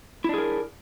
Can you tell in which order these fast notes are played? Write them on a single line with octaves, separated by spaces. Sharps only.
E4 D4 G#4 A#4